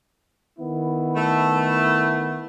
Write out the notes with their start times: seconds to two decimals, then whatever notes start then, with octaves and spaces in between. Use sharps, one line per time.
0.58 D#3 B3 E4
1.16 A3